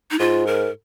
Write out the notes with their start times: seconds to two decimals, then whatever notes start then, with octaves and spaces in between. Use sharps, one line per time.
0.11 D#4
0.19 G#2 F4
0.47 A#4